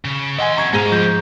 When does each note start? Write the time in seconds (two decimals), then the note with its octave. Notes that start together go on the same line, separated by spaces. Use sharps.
0.05 C#3
0.39 A4 D#5 F#5 G#5 C6
0.57 C3 F#3 A#5 C#6 G#6
0.73 G#2 D#4 F5 D#7
0.92 F3 G6